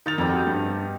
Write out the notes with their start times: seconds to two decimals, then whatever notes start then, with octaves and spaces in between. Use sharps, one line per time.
0.06 D#3 D#4 A#4 A6 F7
0.18 F2 B2 G3
0.47 G2